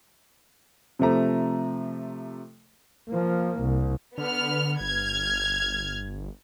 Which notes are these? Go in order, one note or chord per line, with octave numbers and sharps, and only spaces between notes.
C3 F3 A3 A#5
F3 A#3
C2
D3 B3 F6
G1 F6 G#6